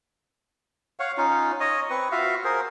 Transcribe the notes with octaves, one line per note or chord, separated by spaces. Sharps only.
C#5 F5 F#5
C#4 D#4 F4
C#5 D#5 D#6
C4 B4 C#6
F4 F#4 E5 F5
G#4 A#4 C5